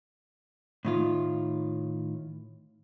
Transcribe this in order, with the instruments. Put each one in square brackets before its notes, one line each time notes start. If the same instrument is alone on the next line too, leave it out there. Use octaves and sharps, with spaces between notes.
[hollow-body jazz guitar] A2 D#3 F4